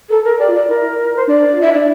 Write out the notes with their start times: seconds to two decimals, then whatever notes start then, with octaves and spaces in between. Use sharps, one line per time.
0.10 A4 A#4
0.24 A#4
0.39 G4 D5
0.49 F4
0.54 D5
0.69 E4 A#4
1.16 C5
1.27 D4 D5
1.52 F4
1.61 E4 E5
1.73 D4 D5